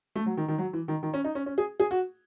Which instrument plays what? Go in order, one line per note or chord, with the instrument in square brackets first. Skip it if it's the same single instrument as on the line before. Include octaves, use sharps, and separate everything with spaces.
[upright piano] A3
F#3
D#3
D#3
F#3
E3
D#3
D#3
C#4
D#4
C#4
C#4
G#4
G#4
F#4